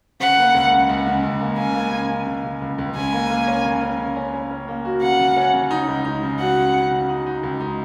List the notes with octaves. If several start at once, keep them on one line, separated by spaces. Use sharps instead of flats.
C#3 F#5
A#3
C#2
C#3
C#2
C#3
C#2
A#3
C#3 G#5
A#3
C#3
C#3
C#3
C#3
C#2
C#2
C#3 G#5
A#3
A#3
C#4
C#3
C#4
C#3
C#4
C#4
C#4
A#3
F#4
C#3 F#5
C#3
C#4
C#3
D#4
C#2
D#4
C#3
F#3 F#5
C#3
C#3
C#3
D#4
D#4
C#2
D#4